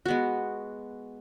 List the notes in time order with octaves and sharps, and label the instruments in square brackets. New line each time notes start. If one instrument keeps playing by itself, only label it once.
[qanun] G#3 B3 F#4